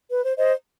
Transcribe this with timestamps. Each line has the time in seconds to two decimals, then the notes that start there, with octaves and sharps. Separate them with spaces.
0.09 B4
0.23 C5
0.37 C5 D#5